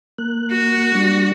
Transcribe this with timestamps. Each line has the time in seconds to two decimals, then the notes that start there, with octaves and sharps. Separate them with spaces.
0.18 A#3 F#6
0.52 F#4
0.95 G3 D4